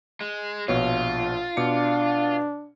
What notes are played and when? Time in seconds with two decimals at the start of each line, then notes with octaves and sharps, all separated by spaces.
0.21 G#3
0.68 A#1 B2 F4 C#5
1.57 B2 D4 D6 C#7